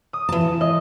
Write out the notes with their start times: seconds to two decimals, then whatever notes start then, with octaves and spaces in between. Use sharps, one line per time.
0.13 D#6
0.29 E3 A5
0.61 D#5